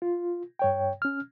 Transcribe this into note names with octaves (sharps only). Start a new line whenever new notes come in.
F4
G2 C#5 G5
C#4 F6